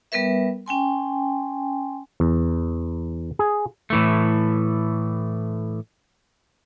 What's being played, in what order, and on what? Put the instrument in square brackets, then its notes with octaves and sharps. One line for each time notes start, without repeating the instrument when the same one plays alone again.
[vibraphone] G3 B3 A#4 B4 E5
C#4 G5 G#5 C6
[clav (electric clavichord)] E2
G#4
[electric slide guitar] A2 E3 A3